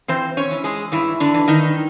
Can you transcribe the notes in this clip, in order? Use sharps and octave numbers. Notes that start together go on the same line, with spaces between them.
E3 C4 C5
C#4 C#5
E3
G#3 G#4
G2 E3 E4
D3 D4
E3
D#3 D#4